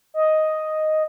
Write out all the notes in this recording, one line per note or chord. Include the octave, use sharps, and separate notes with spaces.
D#5